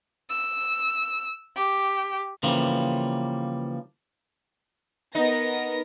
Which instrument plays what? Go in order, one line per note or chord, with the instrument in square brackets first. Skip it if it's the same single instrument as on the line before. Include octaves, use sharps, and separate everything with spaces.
[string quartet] E6
G4
[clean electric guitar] C#3 E3 F3 G3 A#3
[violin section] B3 A#4 A#6 [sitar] D#4